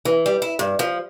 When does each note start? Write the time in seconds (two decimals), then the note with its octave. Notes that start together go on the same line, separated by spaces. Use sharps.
0.05 E3
0.26 G3
0.42 E4
0.59 G2
0.79 F3